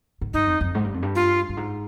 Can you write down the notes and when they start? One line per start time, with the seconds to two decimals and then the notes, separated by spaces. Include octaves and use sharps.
0.21 G#2
0.34 G2 D#4
0.47 F2
0.61 F2
0.75 G#2
0.84 G2
0.94 F2
1.03 G2
1.15 F4
1.49 G2
1.57 G#2